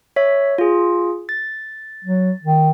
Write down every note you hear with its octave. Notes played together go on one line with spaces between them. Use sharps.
C#5 E5 B6
F4 G#4
A6
F#3
D#3